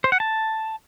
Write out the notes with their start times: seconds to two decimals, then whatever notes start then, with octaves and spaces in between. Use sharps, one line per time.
0.04 C5
0.12 F#5
0.20 A5